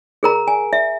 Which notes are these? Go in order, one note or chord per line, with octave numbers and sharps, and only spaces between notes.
G#4 A#4 A#5
G#5
E5